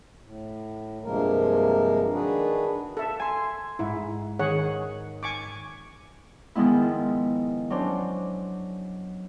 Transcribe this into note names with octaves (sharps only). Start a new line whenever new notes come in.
A2
G2 C3 F3 G#3 A#3 A#4
D#3 D4 F#4 G#4 B4
A4 E5
G#5 C6
G#2 E4
D#3 G#4 C#5 F#5
G#5 C#6 D6
G#2 D#3 F3 G#3 B3 E4
F#3 C#4 D4 C5